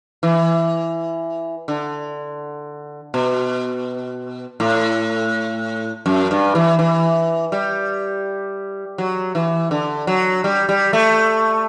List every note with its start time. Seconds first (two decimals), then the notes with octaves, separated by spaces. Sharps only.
0.23 E3
1.68 D3
3.14 B2
4.60 A2
6.06 F#2
6.31 G2
6.55 E3
6.79 E3
7.52 G3
8.98 F#3
9.35 E3
9.71 D3
10.07 F#3
10.44 G3
10.69 G3
10.93 A3